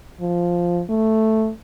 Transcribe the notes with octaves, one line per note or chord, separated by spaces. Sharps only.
F3
A3